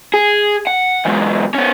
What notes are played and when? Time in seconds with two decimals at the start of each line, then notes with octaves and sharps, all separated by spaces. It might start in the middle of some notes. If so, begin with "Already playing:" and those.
0.14 G#4
0.67 F#5
1.06 E2 G#2
1.54 B3 C#4